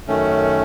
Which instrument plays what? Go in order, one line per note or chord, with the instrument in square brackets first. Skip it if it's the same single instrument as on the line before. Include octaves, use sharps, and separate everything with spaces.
[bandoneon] F#2 D#3 A3 C#4